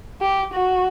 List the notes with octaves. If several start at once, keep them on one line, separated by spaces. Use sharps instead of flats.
G4
F#4